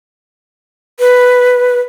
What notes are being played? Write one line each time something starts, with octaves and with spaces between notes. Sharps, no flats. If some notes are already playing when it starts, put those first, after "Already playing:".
B4